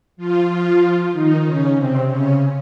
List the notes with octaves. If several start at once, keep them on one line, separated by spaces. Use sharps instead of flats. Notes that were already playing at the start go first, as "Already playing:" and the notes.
F3 F4
F3 F4
D#3 D#4
C#3 C#4
C3 C4
C#3 C#4